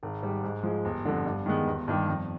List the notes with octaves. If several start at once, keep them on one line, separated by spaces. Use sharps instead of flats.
G#1
G#2 G3
G#2
F3 G#3
G1
F2 D3
G2
D#3 G#3 B3
G1
G2 D#3 G3
F2